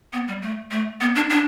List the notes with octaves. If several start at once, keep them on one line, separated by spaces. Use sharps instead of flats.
B3
G3
A3
A3
B3
D4
D4